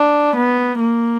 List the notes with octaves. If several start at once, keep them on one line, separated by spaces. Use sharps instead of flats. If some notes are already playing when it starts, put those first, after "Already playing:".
Already playing: D4
B3
A#3